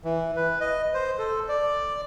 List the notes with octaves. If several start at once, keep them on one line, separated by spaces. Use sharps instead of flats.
E3
B4
D#5
C5
A4
D5